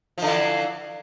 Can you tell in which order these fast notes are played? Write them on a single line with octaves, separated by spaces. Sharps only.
F3 D3 E3